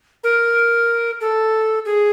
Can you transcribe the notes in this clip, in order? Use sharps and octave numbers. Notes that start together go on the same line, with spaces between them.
A#4
A4
G#4